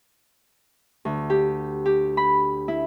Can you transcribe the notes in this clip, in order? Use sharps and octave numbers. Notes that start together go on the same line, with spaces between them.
D2
G4
G4
B5
E4